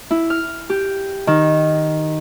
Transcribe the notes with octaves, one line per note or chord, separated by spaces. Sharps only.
E4
F6
G4
D#3